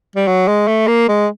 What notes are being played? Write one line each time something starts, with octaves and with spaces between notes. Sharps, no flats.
G3
F#3
G#3
A3
A#3
G#3